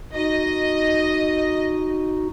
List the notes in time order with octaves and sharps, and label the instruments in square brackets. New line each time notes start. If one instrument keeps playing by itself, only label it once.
[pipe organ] D#4 F#4 [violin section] D#5